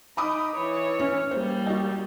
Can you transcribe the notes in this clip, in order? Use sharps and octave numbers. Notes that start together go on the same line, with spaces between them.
D#4 B5 D6 D#6
E3 C#5
C#4
G3 A#3 C5
F#4 D#5